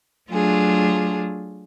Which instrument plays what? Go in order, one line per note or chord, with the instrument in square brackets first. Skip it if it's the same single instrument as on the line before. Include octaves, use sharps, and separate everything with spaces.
[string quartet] F#3 A3 D4 F4 G#4